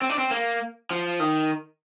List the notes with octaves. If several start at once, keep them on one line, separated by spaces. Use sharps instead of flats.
C4
D4
C4
A#3
F3
D#3